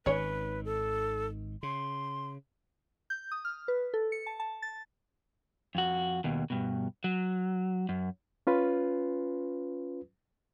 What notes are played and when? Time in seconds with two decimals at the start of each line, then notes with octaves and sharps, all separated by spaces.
0.06 G#1 D#3 C#4 B4 C#5
0.65 A4
1.63 C#3 C6
3.10 G6
3.31 D#6
3.45 F6
3.68 B4
3.94 A4
4.12 C#7
4.27 A5
4.40 A5
4.62 A6
5.75 F2 F#4
6.24 D#2 B2
6.50 G2 B2
7.04 F#3
7.89 F#2
8.47 C#4 F4 B4